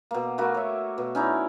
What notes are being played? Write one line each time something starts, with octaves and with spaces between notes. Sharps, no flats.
B2 A#3
A3 A#3 F#4 B4
C#5 E5
B2
C#4 D#4 E4 D5